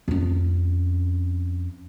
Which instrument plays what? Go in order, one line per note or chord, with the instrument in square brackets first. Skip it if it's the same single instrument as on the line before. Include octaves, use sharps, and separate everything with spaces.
[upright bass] F2 C#4